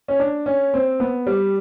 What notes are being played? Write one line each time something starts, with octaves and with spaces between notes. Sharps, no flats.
C#4
D4
C#4
C4
B3
G3